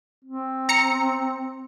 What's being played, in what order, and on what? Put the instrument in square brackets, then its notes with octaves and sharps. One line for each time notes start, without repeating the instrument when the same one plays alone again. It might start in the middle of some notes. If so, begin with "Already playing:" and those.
[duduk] C4
[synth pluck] A#5 C#7